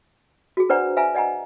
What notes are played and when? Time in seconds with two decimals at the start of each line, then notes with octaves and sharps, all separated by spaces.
0.57 F#4 G#4
0.69 D4 B4 C5 D5 F#5 A#5
0.97 B4 E5 F5 G#5 A#5
1.15 D5 D#5 F#5 G#5 A#5